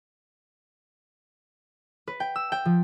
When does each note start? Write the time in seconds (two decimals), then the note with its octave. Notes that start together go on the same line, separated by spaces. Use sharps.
2.07 B4
2.20 G5
2.36 E6
2.52 G5
2.65 F3